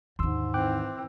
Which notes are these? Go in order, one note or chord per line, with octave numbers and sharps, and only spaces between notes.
D#2 G#2 D3 C6 E6
E3 C4 G5 D6 F#6